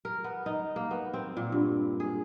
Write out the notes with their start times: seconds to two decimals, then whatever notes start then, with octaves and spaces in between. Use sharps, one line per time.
0.05 A#4
0.24 B3
0.46 D#4
0.76 A#3
0.91 B3
1.14 C4
1.37 A#2
1.52 G2
2.00 G#4